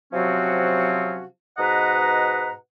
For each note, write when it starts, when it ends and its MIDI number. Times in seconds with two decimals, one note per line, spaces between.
0.13 1.24 48
0.13 1.24 53
0.13 1.24 54
0.13 1.24 60
0.13 1.24 61
0.13 1.24 66
1.58 2.51 44
1.58 2.51 47
1.58 2.51 71
1.58 2.51 75
1.58 2.51 78
1.58 2.51 82